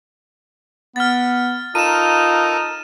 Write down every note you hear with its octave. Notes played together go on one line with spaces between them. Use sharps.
B3 F6 A6
D#4 F4 A4 A#4 D#7 E7